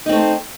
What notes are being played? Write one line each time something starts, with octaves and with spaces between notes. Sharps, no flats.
A3 C4 D#4 C5